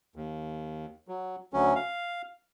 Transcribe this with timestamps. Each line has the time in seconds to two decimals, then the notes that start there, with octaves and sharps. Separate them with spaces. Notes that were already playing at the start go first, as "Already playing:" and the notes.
0.16 D#2
1.08 F#3
1.53 D2 F#3 C#4
1.76 F5